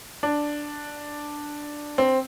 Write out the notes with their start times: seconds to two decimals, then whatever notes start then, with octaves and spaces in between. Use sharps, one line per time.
0.23 D4
1.98 C4